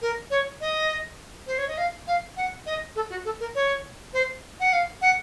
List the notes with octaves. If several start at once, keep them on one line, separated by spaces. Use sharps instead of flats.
A#4
C#5
D#5
C5
C#5
D#5
F5
F5
F#5
D#5
A4
F#4
A4
A#4
C#5
C5
F#5
F5
F#5